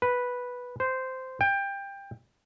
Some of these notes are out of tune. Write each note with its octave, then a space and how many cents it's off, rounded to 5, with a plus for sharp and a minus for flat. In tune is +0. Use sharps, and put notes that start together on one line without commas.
B4 -5
C5 -10
G5 +20